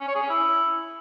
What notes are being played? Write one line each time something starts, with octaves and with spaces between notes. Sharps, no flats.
C#4
C#5
G#4
C#4
E4